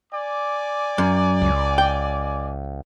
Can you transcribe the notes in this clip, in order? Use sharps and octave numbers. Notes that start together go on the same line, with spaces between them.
D5 G#5 D6
F#2
C#2
G5